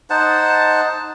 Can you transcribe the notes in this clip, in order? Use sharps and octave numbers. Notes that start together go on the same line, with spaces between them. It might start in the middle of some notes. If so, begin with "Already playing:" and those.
D#4 C5 F#5 A5